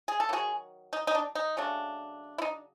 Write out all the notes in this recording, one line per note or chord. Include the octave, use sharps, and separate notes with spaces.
G#4
A4
D#3 F#3 A#3 F#4 G#4
D#4
D#4
D4
D#4
C#3 F#3 A3 D4
E4
D#4